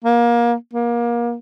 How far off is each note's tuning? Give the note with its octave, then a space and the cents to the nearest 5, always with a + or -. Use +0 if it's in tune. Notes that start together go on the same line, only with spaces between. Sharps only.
A#3 +25
A#3 +30